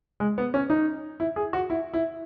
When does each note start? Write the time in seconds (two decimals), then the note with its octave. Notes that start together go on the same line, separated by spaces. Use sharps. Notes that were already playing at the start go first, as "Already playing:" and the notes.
0.20 G#3
0.38 B3
0.54 C#4
0.70 D#4
1.20 E4
1.36 G#4
1.53 F#4
1.70 E4
1.94 E4